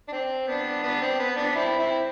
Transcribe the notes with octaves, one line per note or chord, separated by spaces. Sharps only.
D4
C4
B3 D4
B3 D4
C4
B3
B3 D4
C4 E4
C4 E4